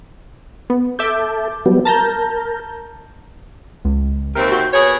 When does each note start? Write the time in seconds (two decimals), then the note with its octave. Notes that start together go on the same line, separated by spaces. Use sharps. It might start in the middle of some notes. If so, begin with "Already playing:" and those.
0.70 B3
0.99 A4 E5 D6 G6
1.66 F#3 G3 B3
1.85 A#4 A5 A#5 G6
3.85 C#2
4.35 D#2 C3 C4 A#4
4.52 F#4 G6
4.72 B2 G#4 C#5